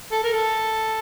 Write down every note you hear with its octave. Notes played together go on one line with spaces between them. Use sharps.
A4
A#4
A4